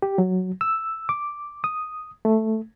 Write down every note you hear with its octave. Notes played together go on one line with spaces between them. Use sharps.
G4
F#3
E6
D6
D#6
A3